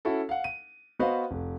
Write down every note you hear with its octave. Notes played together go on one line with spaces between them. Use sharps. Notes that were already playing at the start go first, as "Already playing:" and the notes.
C#4 E4 F#4 A4
F5 F#5
D#7
B3 F#4 B4 C5 D#5 F5
F1